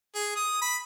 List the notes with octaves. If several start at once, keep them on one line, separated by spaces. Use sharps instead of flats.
G#4
D#6
B5